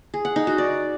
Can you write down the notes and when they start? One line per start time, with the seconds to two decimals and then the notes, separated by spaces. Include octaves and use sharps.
0.14 G#4
0.25 F#5
0.36 D#4
0.47 F#4
0.58 D5